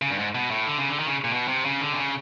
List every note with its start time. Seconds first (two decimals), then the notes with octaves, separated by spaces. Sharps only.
0.02 C#3
0.10 G2
0.19 G#2
0.35 B2
0.51 A2
0.67 D3
0.78 C#3
0.89 D3
0.99 D#3
1.07 C#3
1.24 A#2
1.32 B2
1.48 C3
1.65 C#3
1.81 D3
1.93 C3
1.96 C#3